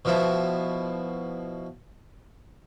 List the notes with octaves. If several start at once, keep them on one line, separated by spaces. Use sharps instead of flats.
B2 F3 E4